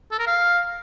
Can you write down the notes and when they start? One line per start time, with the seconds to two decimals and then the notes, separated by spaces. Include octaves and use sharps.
0.11 A4
0.19 A#4
0.27 F5